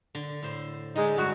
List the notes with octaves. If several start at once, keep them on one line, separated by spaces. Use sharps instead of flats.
D3
A2 C5 C6
D3 G#3 D#4 G4
G2 F#4